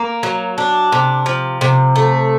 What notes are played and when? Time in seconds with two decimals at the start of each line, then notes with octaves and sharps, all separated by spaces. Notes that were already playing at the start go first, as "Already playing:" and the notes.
Already playing: A#3
0.23 F#3
0.58 D4
0.92 C3
1.26 F3
1.61 C3
1.96 A3